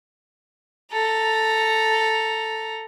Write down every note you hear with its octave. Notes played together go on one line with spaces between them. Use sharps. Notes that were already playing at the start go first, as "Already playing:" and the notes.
A4 A#5